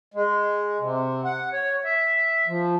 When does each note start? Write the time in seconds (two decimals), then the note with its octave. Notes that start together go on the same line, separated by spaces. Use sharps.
0.14 G#3
0.80 C3
1.24 F#5
1.53 C#5
1.84 E5
2.47 F3